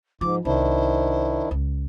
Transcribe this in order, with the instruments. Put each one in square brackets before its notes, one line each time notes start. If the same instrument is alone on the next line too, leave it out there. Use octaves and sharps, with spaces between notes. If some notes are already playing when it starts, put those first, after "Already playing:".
[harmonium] G#2 [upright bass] F3 [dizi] D6
[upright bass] C2 [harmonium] D#3 D4 E4 [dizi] C5
[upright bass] C#2